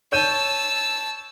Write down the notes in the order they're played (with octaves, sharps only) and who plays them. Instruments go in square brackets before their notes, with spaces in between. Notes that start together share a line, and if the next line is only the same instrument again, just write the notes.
[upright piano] C#5 G6 D#7 [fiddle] A5 E6